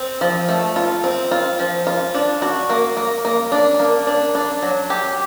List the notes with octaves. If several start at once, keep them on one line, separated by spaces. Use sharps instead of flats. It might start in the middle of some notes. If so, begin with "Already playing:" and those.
Already playing: C4
F3
A3
F4
C4
F4
F3
F4
D4
F#4
A#3
A#3
A#3
D4
A#3
D4
D4
F#3
G4